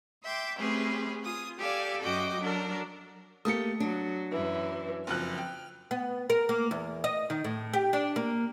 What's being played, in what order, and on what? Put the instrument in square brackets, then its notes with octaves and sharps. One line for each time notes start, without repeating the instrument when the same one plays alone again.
[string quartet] E5 G5 C6 D6
A3 C4 C#4 G4 G#4 B4
F4 G#5 D#6
G4 A4 D5 F5 G#5
F#2 F#4 D#5 G5 D6
F#3 D4 A4 A#4
[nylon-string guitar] A3 A#3 G4 [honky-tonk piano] D#6 C#7
[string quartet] F#3 [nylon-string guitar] D4
[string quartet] F#2 E3
[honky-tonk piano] F#1 F2 F#6 [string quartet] F6
[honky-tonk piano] G5
[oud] B3
A#4
A#3
E2
D#5
D#3
A2
G4
D4
A#3